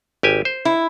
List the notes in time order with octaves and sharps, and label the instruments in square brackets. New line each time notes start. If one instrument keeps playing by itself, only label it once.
[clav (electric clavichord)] G#1 G4 G#5
C5
[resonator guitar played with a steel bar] E4